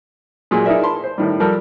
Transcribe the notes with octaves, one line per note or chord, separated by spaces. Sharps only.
A#2 F#3 G#3
D#4 E4 G#4 A#4 D5 E5
A5 B5 C6
C5
A2 D#3 G3
F3 G3 A4 A#4